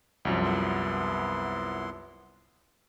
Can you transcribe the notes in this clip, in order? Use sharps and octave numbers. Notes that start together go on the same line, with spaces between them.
C2 F#2 F3
B3 E4 C6